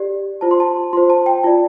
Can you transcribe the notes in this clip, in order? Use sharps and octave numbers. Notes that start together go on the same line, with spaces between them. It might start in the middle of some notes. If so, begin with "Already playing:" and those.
Already playing: G4 D5
F4 C5 A5
C6
A5
F4 C5 C6
A5
G5
F4 D5 A5